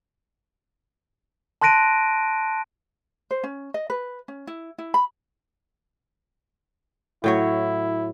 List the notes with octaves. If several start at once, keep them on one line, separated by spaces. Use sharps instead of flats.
A5 C6 F#6 A#6 D7 D#7
C5
C#4
D#5
B4
C#4
E4
E4
B5
A2 F#3 E4 C#5